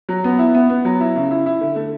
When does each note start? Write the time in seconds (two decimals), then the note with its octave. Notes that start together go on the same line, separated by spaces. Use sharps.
0.09 F#3
0.24 B3
0.39 E4
0.55 B3
0.70 B3
0.85 F#3
1.00 E4
1.16 C#3
1.31 E4
1.46 E4
1.61 D3
1.76 A3